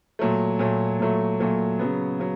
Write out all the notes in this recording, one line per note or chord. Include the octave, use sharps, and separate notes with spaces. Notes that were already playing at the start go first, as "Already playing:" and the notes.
A#2 F#3 A3
A#2 F#3 A3
A#2 F#3 A3
A#2 F#3 A3
C#3 F#3 B3
C#3 F#3